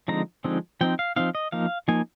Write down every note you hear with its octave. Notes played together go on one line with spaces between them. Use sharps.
D3 F3 G#3 C4 D#4 A#5
D3 F3 G#3 C4 D#4
F3 C4 D#4 G5
F5
F3 C4 D#4 F5
D#5
F3 A#3 D#4 F5
F3 A#3 D#4 G#5